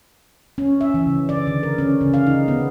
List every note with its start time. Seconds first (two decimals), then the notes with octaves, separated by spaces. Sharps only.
0.58 C#4
0.81 E5
0.94 E3
1.07 C#3
1.29 D5
1.47 D3
1.63 A#4
1.78 C#4
2.01 C#3
2.14 F5
2.27 D#4
2.48 B3